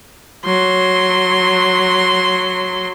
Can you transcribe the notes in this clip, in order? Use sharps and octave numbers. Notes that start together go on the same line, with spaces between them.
F#3 C6